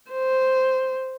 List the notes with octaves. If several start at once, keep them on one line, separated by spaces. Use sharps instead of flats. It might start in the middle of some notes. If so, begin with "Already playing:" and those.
C5